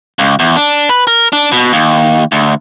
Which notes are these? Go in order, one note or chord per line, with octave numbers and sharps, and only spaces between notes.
C#2
E2
D4
B4
A#4
D4
B2
D#2
D2